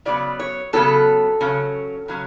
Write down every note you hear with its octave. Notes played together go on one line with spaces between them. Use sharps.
C#3 F#3 B3 D5
C#5
C#3 F#3 B3 A4
C#3 F#3 C#4
C#3 F#3 C#4